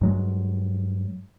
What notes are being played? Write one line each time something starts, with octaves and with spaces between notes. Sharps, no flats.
G2 F#3 G#3